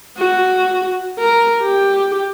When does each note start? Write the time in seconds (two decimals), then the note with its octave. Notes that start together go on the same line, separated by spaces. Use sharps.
0.18 F#4
1.19 A#4
1.63 G4